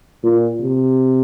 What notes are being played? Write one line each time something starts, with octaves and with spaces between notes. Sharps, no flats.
A#2
C3